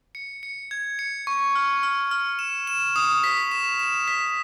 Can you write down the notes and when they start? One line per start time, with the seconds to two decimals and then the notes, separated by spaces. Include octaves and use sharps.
0.15 C#7
0.43 C#7
0.71 G#6
0.99 C#7
1.27 C#6
1.55 F6
1.83 F6
2.11 F6
2.39 E7
2.67 E7
2.96 D#6
3.24 B6
3.52 E7
3.79 E7
4.08 B6